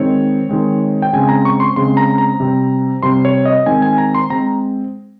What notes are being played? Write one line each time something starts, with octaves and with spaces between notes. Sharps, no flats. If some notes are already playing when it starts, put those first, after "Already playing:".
Already playing: D#3 G#3 C4 C#5
D#3 G#3 C4
G5
C#3 G#3 C4 G#5
A#5
C#6
C6
C#3 G#3 C4 C6
A#5
A#5
C3 G3 C4
C3 G3 C4 C6
C#5
D#5
D#3 G#3 C4 G#5
G#5
A#5
C6
G#3 C4 A#5